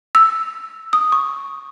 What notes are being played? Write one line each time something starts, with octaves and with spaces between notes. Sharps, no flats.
E6
D#6
C#6